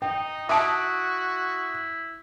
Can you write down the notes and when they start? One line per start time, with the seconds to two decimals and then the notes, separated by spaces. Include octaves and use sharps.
0.02 D#4 G5
0.49 E4 F#4 E5 A5 D#6 D7